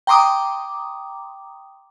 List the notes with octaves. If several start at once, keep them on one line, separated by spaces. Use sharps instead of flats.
G5 A#5 C6 D6 D#6